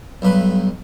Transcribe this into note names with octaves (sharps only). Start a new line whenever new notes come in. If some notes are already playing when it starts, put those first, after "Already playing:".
B1 G2 B4